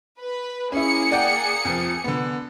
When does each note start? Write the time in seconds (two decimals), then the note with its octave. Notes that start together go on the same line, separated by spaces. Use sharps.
0.20 B4
0.72 A#3 C#4 E4 G#4 C#7
1.11 D5 F#5 G5
1.65 F2 F3
2.04 D3 B3